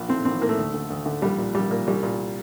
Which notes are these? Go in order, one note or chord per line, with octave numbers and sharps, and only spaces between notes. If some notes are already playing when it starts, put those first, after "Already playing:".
Already playing: A#1
A2 C4
A#1 C4
A2 A#3
A3
D2
D3
D2
D3
A#1 G3
A#2
A#1 G3
A#2 A#3
C2 G3
A#2